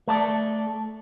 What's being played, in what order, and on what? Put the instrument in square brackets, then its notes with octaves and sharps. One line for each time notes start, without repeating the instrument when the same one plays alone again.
[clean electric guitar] A3 A4 D5